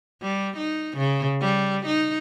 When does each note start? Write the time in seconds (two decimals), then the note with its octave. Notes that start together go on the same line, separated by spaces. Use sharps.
0.22 G3
0.57 D#4
0.97 C#3
1.41 G3
1.86 D#4